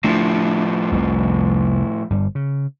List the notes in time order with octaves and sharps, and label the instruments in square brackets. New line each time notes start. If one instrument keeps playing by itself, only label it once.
[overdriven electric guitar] A2 F3 [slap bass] A3 D4
[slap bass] F1 C2
G1 G2 G3
C#3